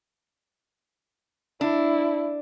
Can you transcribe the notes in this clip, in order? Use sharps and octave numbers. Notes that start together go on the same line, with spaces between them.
D4 E4